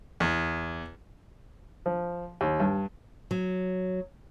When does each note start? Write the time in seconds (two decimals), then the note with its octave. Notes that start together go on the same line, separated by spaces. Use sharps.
0.20 E2
1.86 F3
2.41 D#2
2.60 G2
3.31 F#3